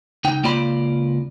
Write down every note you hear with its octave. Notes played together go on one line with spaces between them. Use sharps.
C#2 D#4 G5
C#2 A#3 F4 D5 B5